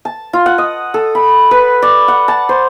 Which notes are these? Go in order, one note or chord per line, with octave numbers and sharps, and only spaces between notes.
A5
F4
F#5
D#5
A4
B5
B4
D5
F#5
A5
C5